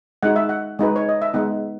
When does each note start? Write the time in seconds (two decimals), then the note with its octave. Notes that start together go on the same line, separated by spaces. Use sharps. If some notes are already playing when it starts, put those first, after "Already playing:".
0.23 G#3 D#4 F#4 F#5
0.36 E5
0.49 F#5
0.79 G#3 D#4 F#4 B4
0.96 C#5
1.09 D#5
1.22 E5
1.34 G#3 B3 D#4 F#5